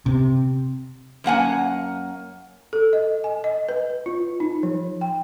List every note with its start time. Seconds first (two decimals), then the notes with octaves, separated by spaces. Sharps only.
0.06 C3
1.24 F#2 A#3 F#5 G#5
2.73 A4
2.93 D#5
3.24 G#5
3.44 D#5
3.69 B4
4.06 F4
4.40 D#4
4.63 F3
5.01 G5